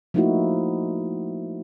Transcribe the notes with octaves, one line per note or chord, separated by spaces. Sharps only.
F3 A3 A#3 D#4 E4 F#4